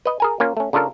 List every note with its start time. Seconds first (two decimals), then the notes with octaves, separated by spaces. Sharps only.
0.05 B4 D#5
0.20 G#4 A#4 G#5
0.40 A#3 C#4 F4
0.57 A3 C#4
0.73 C#3 D4 F4 A4 A#4